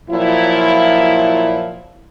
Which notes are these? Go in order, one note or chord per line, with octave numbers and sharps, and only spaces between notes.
A#2 F3 F#3 E4